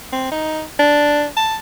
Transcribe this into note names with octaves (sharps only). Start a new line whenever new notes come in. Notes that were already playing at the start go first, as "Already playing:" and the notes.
C4
D#4
D4
A5